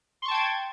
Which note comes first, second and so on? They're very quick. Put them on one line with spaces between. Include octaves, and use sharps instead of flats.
C6 C#6 A5 G5 G#6